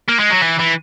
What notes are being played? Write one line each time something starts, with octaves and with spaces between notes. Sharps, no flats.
A#3
G#3
F#3
E3
E3